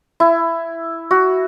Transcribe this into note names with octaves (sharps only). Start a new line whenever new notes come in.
E4
F#4